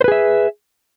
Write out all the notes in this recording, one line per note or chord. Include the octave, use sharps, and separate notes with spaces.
G#4 B4 C5 E5